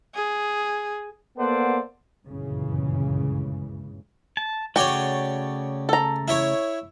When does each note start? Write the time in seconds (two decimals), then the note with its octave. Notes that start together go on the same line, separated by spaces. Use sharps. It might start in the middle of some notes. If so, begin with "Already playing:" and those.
0.15 G#4
1.38 A#3 B3 A4 C5 D5 F#5
2.26 G1 C#2 F#2 A#2 C#3 E3
4.37 A5
4.76 C#3 A3 F#4 C#5 D5 G5
5.89 A4 A#5
6.28 E4 C#5